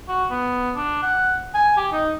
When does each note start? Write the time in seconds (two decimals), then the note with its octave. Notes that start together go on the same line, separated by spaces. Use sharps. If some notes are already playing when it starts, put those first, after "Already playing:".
0.09 F#4
0.30 B3
0.76 D4
1.03 F#5
1.54 G#5
1.77 G4
1.92 D#4